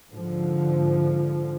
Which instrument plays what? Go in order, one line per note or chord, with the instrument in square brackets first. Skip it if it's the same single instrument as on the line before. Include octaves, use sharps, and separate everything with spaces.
[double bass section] G#2 D3 F3